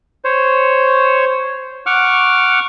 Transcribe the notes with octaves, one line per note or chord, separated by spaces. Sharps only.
C5 C#5
F#5 C#6 D6 F6